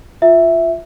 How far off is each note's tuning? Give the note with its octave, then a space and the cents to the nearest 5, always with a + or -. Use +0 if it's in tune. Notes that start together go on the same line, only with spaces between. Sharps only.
F4 +0 E5 +0